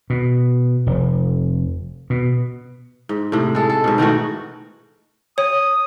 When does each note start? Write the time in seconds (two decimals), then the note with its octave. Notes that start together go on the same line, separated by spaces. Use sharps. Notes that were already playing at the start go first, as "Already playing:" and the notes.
0.10 B2
0.86 F1
2.10 B2
3.09 G#2
3.32 A2 C3
3.55 G#3 A4
3.70 A4
3.84 G#2 B2
3.98 D#3 E3 A3 F#4
5.38 C#5 D#6